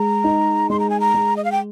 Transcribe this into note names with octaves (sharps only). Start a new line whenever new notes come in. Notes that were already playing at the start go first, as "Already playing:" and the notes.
Already playing: G#3 A#5
D#4
G#3 C6
A#5
G#5
A#5
G#3
D#5
F5
G5